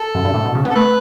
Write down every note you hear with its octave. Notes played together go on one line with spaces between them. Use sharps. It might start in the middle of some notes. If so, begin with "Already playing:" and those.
Already playing: A4
F#2
G2
A2
B2
C#3
B3
A4
A3 B4